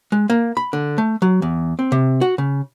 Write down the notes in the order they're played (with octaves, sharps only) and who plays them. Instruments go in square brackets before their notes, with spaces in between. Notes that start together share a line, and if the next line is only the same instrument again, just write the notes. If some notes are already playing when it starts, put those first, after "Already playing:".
[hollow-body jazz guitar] G#3
A#3
B5
D3
A3
F#3
E2
C4
C3
F#4
C#3